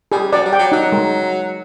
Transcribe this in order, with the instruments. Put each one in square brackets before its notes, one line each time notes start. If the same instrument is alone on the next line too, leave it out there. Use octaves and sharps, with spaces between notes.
[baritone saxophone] G3 [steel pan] G#4
[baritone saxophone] F#3 [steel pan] D5
[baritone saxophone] G3
[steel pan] G5
[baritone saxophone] F#3
[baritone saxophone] F#3 [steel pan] D#4
[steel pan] G#3